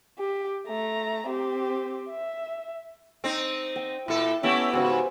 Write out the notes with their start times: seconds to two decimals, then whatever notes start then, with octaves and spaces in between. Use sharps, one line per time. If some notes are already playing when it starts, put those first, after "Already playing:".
0.19 G4
0.67 A3 A#5
1.27 C4 G4
2.10 E5
3.24 C4 D#4 D#5 C#6 D6
3.76 G5
4.08 A#2 E4 A4
4.43 A3 B3 C#4 E4 G4
4.73 G#2 C#3 F#4 G4 C5 G#5